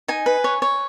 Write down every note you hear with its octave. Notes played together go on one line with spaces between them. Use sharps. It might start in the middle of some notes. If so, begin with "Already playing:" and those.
D#4 G#5
B4
C#5
C#5